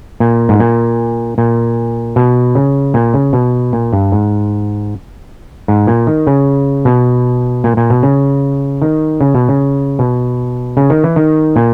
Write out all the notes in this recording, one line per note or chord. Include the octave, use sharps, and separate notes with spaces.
A#2
G#2
A#2
A#2
B2
C#3
A#2
C#3
B2
A#2
G2
G#2
G#2
A#2
D#3
C#3
B2
A#2
A#2
B2
C#3
D#3
C#3
B2
C#3
B2
C#3
D#3
E3
D#3
A#2